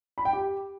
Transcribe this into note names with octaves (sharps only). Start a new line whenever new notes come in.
B5
G5
G4